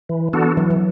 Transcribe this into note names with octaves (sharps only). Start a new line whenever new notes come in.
E3
E3 B3 D4 F#4 A4
E3 F#3
F#3